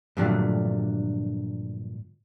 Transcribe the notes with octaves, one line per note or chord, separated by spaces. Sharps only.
G2 A#2 D3 F3 F#3 A3